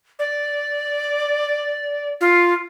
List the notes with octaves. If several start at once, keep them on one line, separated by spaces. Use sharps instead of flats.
D5
F4